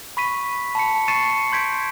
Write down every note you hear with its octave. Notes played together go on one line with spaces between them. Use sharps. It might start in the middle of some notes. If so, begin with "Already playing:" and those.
B5 C#6 B6 D#7
A5 B5 C#7
C#6 A6 C7 C#7 D#7 E7
C6 G6 G#6 B6 D7